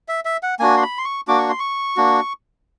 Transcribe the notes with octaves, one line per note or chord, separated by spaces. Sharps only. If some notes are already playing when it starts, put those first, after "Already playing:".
E5
E5
F#5
A#3 D4 F#4 G#5
C6
B5
C6
C#6
A#3 D4 F#4 D6
C#6
C6
C#6
A#3 D4 F#4